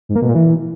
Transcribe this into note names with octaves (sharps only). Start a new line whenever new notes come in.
G#2
A#3
B2
A#2
E3